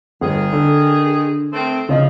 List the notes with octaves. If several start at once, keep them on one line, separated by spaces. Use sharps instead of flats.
G1 D#3 G#4
D3
D#3 A3 C4
C#3 F3 D#5